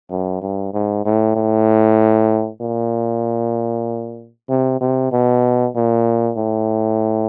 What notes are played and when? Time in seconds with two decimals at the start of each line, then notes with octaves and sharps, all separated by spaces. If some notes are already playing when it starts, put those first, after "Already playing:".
0.10 F#2
0.42 G2
0.74 G#2
1.05 A2
1.36 A2
2.61 A#2
4.49 C3
4.81 C3
5.12 B2
5.76 A#2
6.37 A2